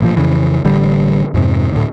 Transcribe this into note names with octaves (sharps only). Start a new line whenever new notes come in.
A1 A#2 F3
F2 C#3 E3
A1 D3 G3
F2 G#2 C3
D2 A2